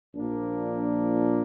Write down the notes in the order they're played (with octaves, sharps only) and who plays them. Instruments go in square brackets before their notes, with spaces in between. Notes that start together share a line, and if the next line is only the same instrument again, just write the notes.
[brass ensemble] A#1 A#2 F3 A#3 D4